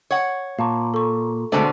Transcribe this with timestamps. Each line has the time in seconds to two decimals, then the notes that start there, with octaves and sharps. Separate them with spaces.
0.11 C#5 F#5
0.59 A#2 F5 A5 C#6
0.94 A4 C#6
1.52 B2 D3 G#3 A3 C4 C5 A5